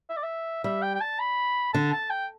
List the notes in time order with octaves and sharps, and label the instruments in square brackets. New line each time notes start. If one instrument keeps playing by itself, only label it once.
[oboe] E5
D5
E5
[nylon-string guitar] G3 [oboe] E5
[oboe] G5
G5
A5
B5
[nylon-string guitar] D3 [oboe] A5
[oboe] A5
G5